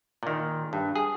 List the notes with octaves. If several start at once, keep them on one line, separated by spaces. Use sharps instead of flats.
A#2 D#3
G2
G#4